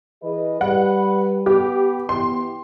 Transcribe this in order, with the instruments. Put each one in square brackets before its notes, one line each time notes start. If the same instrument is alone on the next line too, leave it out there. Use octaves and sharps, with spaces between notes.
[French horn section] E3 G#4 D#5 [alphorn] B4
[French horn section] G3 [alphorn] B4 [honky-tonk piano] F#5
[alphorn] B3 [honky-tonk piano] G4
[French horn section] E3 B3 [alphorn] G4 [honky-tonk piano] C6